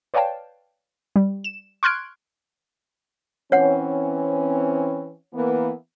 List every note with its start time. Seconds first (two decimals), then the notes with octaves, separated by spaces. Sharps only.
0.14 B4 C#5 D5 F5 G5 A5
1.16 G3
1.44 E7
1.83 C6 C#6 F6 F#6 G#6 D7
3.52 E3 C4 C#4 C#5 F#5
5.34 E3 A#3 B3